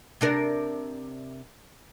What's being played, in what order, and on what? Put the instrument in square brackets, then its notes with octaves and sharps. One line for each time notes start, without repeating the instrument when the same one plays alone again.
[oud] C3 D4 A#4